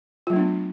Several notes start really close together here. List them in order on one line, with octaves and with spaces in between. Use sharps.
F4 F#3 A3 D4 B3